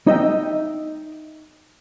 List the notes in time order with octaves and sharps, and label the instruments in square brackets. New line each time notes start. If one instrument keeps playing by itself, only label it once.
[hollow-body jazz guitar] D#4 D#5 E5 G5